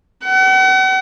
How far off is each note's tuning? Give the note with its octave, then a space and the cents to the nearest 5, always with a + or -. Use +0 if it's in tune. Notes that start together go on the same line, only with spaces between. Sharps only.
F#5 +40